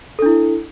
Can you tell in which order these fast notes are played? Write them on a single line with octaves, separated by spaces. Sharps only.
A4 D4 E4